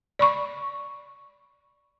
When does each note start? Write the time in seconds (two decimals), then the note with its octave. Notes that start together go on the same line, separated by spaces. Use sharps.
0.19 D5 B5 C#6